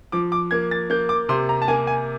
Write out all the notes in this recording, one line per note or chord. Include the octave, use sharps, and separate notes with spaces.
F3 D6
D6
A#3 G#6
A6
A#3 G6
D6
C3 C6
A#5
A5
A#3 G#5
G#5